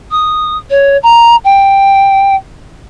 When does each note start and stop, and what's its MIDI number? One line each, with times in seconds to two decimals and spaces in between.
0.11 0.57 87
0.70 0.97 73
1.03 1.36 82
1.45 2.36 79